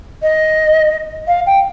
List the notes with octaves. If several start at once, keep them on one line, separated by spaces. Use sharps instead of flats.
D#5
F5
G5